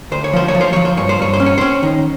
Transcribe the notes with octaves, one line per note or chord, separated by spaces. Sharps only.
D2 C5
C#5
F3 C5
C#5
F3
C5
F3 C#5
C5
G2 C#5
C5
G2 C#5
C5
C#4
C#5
C#4 C5
D#3